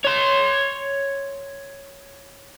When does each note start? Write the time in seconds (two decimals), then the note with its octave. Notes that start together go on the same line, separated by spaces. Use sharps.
0.05 C#5 C6